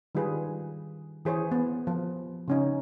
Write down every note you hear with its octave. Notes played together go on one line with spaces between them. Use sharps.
D#3 G3 F4 G#4 B4
E3 G#4 C5 C#5
B3
F3
C#3 C#4 D#4